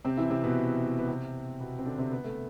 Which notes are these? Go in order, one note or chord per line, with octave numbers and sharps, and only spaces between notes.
C3 C4
E3 E4
C3 C4
B2 B3
B3
C3 C4
B2 B3
C4
D3 D4
C3 C4
B3
A3